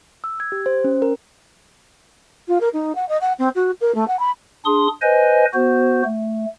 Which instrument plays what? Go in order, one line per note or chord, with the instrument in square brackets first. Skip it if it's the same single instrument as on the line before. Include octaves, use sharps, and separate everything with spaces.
[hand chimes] E6
G#6
G4
C5
C#4
A#4
[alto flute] F4
A#4
D#4
F#5
D#5
F#5
C4
F#4
A#4
A3
F#5
B5
[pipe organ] D4 G#4 C6 D#6
B4 C5 D#5 G#5
B3 F#4 C5
A3